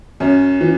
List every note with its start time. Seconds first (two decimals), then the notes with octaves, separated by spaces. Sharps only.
0.20 F#2 C#4
0.61 E3